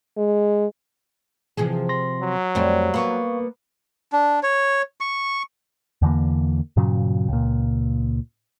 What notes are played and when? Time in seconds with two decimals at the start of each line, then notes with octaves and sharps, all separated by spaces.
0.17 G#3
1.57 C3 E3 F3 G#4
1.89 C6 A#6
2.22 F#3
2.55 F2 G3 A3 C5 C#5
2.94 A#3 B3 F5 C#6
4.12 D4
4.43 C#5
5.01 C#6
6.02 E2 D3 E3 A#3
6.77 G2 A#2 C#3 F#3
7.29 C#2 A#2